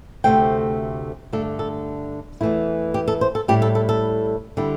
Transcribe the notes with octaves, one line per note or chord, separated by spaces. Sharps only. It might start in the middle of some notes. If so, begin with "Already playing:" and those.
D2 C3 A3 C4 G5
G2 D3 A3 D4 A4
A4
E2 E3 A3 E4
G4
A4
C5
A4
A2 G3 E4 G4
A4
A4
A4
D3 G3 E4